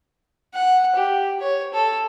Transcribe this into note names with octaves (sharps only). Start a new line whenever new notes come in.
F#5
G4
C#5
A4